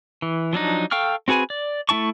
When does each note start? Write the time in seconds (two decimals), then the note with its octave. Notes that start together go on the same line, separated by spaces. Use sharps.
0.22 E3
0.53 F3 F#3 D4 D#4
0.91 A4 F5 G5 C#6 F6
1.28 C4 F#4 G#4 B4 G#5
1.50 D5
1.89 A3 C4 E4 A5 C#6